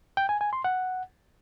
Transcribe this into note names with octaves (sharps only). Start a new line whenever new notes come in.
G5
G#5
G#5
C6
F#5